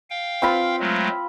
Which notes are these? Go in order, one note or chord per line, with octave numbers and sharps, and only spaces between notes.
F5 G5
C4 F4 B5
F#3 G#3 A3